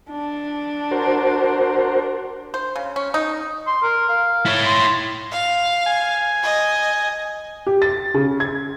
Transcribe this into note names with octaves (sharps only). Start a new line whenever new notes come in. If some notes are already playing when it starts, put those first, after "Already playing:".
D4
F#4 A#4 C5
C5
C#3
C#4
D#4
C6
A#4
F5
E4 C#5
C6
F5
G#5
D#5
G4
A6
C#3
G#6